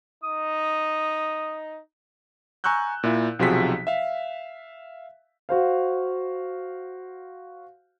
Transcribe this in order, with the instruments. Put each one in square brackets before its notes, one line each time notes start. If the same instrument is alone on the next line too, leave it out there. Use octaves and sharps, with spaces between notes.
[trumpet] D#4 [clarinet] D#6
[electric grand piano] G#5 A#5 C#6 E6 F#6 G6
A#2 E4
B1 C3 F3 F#4 G#4 B6
E5 F5
[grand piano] F#4 C5 F5